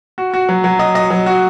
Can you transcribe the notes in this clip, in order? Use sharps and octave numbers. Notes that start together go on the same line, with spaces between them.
F#4
F#4
F#3
F#3
D#5
D#5
F#3
F#4